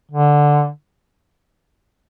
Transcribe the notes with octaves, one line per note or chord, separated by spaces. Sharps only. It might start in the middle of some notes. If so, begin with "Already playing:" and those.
D3